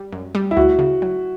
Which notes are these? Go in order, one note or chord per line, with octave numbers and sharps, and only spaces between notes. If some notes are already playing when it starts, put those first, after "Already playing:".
Already playing: G3
F#2
G3
E4
D2 F#4
C#3
F#3